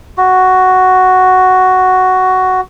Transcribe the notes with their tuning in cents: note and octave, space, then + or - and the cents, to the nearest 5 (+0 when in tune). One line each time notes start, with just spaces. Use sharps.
F#4 +5